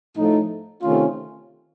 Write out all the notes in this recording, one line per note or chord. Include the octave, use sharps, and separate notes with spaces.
A2 F3 A3 D#4
C3 D#3 A3 C#4 F4